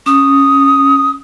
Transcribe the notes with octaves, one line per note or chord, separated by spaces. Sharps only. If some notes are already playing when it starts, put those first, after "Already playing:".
C#4 D#6